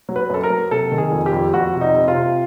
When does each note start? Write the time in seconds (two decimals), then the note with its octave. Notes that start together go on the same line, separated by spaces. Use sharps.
0.09 F#3
0.16 B4
0.30 F#2 A4
0.43 A#4
0.50 F#3
0.71 C3 A4
0.92 D#3
0.98 G#4
1.12 F2
1.26 G4
1.33 F2
1.54 F2 F#4
1.75 C3
1.81 D#4
1.94 C3
2.08 F4
2.16 C3